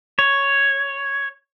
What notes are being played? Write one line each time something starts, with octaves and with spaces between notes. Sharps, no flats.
C#5